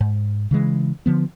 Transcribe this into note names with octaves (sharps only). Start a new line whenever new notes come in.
G#2
C#3 E3 G#3
D3 F3 B3